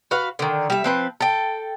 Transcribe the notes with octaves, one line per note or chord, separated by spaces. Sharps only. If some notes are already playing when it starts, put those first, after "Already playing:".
F#4 B4 F5
D3 D#3
G3 E5
F3 C4 B4
A4 G5